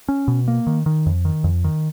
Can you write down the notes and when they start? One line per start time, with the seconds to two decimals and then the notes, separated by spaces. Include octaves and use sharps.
0.08 C#4
0.28 B2
0.48 A#3
0.67 D#3
0.86 D#3
1.06 F2
1.25 D#3
1.44 F2
1.64 D#3